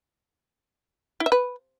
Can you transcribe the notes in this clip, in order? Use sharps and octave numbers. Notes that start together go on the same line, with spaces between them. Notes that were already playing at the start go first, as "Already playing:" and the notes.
E4
E5
B4